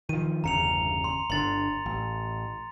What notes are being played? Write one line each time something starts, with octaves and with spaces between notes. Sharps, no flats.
D#3 F3 D#7
G1 E2 C#3 A#5 C#7 F7
C6
G1 D3 C6 A6
A1